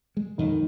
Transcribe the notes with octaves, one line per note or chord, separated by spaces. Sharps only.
G#3
F2 D#3